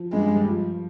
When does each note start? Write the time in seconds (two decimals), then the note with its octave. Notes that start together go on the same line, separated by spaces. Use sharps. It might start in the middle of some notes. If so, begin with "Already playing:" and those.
Already playing: F3
0.13 G2 G3 G#3
0.36 G3
0.45 F3